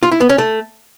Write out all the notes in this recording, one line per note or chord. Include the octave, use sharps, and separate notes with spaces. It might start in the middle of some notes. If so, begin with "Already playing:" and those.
F4
E4
B3
C#4
A3